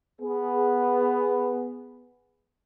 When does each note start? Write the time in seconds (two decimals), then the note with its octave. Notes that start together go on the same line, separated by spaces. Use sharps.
0.21 B3 G#4